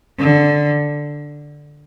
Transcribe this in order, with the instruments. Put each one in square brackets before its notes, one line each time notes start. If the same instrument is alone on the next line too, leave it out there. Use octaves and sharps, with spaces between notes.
[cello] D3